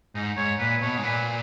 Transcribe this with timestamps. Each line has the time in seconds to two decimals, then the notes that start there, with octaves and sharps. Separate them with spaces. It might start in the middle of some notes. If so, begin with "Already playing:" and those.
0.15 G#2 D#4
0.37 G#2 C#5
0.59 A#2 B4
0.81 B2 C#5
0.98 G#2
1.03 A#2 B4